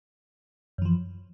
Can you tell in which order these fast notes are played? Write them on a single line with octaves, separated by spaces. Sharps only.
F#2 E3 F3